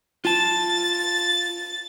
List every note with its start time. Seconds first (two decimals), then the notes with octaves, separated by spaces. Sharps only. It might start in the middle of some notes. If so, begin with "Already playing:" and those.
0.25 F4 A5 A6